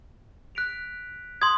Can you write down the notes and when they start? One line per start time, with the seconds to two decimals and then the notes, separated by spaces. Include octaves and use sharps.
0.55 F#6 B6 D7 F7
1.41 C6 D#6 G#6